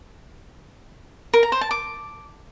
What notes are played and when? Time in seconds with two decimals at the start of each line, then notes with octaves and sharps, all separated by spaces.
1.33 A#4
1.43 A#5
1.52 C5
1.61 A5
1.71 D6